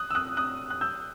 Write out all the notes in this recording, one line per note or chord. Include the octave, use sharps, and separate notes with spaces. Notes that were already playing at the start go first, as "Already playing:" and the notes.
Already playing: D#6 F#6
E6
D#6 F#6
D#6 F#6
F#6
E6 G6